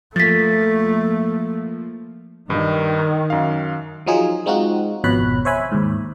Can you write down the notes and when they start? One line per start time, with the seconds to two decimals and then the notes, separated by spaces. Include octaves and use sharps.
0.16 F3 A3 A#3 A6 B6
2.50 G2 D#3
3.30 F#2 F5
4.06 F3 F#3 D#4 F4 G#4
4.46 G#3 C4 D#4 F4 F#4
5.04 G#1 F2 B2 C#5 B5 F#6
5.45 C5 C#5 E5 G#5 B5
5.72 D#2 G#2